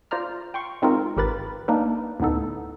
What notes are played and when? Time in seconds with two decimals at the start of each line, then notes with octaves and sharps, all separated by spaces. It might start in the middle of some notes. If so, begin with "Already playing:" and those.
0.11 F4 C5 D5 A#5 F6
0.54 G5 C6 C#6
0.82 G#3 C4 D#4 F4 A#4
1.17 G#1 G4 A#4 B4 B5 A6
1.68 A#3 D4 D#4 A#4 B4
2.20 D2 A2 B3 D#4 A4